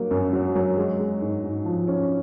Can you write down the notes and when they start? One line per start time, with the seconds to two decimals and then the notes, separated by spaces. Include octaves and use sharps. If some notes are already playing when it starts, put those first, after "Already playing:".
Already playing: F#3 A#3
0.11 F#2
0.33 F#3
0.55 F#3
0.77 G#3
0.99 G#3
1.21 G#2
1.43 G#2
1.65 F3
1.87 C#4